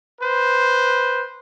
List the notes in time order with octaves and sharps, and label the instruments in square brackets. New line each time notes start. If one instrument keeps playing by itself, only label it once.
[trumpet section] B4 C5